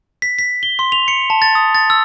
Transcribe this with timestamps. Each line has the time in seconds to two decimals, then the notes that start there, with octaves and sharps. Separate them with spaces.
0.22 B6
0.39 B6
0.63 G7
0.79 C6
0.92 F7
1.08 C#7
1.30 A5
1.42 A6
1.55 D#6
1.75 A6
1.90 E6